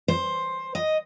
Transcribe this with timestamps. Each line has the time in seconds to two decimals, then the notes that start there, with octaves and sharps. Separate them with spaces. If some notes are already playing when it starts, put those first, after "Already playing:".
0.08 C5
0.75 D#5